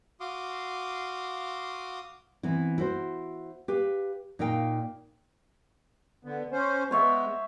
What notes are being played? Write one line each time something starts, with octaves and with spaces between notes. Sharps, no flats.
F#4 F5 C6 D6 D#6
E3 B3 C4 E4
E4 F#4 C5
G4 B4 F5
A#2 D#4 A#4 F5 G5
D3 B3
C#4 C5
G#3 B3 C5 C#5 E5